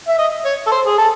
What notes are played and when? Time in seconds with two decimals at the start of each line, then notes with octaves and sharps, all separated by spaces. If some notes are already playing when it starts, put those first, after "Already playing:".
0.08 E5
0.18 D#5
0.45 C#5
0.67 A4
0.71 C5
0.86 G#4
0.98 A4